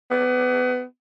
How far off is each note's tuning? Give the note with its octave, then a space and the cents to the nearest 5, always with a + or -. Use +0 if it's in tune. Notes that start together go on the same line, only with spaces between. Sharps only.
B3 +25